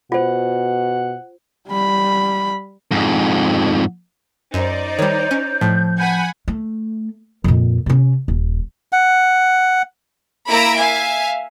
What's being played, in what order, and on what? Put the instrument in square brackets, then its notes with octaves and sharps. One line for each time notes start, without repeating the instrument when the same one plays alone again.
[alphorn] B2 [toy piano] F4 C5 [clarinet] F#5
[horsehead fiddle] G3 B5
[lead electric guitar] F2 G#2
[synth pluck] F#2 [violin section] D#4 C5 D5
[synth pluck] D#3 G3 [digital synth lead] C#5 [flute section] G6
[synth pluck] C#4
[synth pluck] A2 [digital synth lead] F3
[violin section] F#5 G#5 B5
[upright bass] A3
F2 A#2
C3 C#4
D#1
[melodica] F#5
[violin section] A#3 E4 A#5 B5 E6 D7
E5 F5 G#5